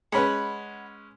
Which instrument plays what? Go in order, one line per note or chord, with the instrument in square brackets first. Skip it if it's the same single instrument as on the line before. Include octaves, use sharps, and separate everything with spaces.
[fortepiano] G#3 C#4 B4 [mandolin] F#5 B5